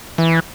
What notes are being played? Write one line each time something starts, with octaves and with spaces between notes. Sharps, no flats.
E3